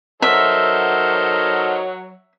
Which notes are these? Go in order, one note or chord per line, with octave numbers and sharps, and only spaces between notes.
F#3 D#4 A4 A#4 C5 E5